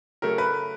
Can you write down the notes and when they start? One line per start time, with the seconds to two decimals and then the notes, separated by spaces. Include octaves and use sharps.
0.22 C#3 F#3 A3 A#4
0.38 B4